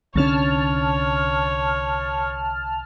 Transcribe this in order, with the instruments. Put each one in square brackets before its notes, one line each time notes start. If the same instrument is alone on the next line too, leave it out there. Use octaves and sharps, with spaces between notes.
[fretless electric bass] C2 D3 C#4 [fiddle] C#5 [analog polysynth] A5 F6